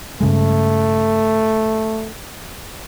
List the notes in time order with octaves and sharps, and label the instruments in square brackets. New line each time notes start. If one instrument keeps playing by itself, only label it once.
[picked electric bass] G2 C#3 G#3 [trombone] A3